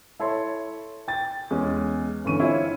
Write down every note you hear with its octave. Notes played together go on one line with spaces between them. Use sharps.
E4 A4 C#5 E5 C6
G5 A6
E2 G#3 C#4
G1 D3 E3 C#4 C#6 D#7
C4 C#4 E4 F4 C#5